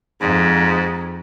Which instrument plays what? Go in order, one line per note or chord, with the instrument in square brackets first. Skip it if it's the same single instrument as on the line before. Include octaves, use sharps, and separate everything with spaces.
[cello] F2 [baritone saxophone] G#2